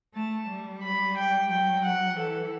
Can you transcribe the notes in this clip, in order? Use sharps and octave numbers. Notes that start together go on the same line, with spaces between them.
A3 A5
G3
B5
G5
F#3 G5
F#5
E3 A4